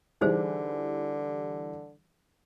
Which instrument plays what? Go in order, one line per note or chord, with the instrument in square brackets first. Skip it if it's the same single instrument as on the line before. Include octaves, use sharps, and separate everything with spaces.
[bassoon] D3 [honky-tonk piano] E3 G3 [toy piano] D#4 G#4 C5